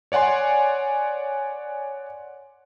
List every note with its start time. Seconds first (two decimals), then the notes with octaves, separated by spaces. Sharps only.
0.12 C#5 D5 F#5 G#5 C6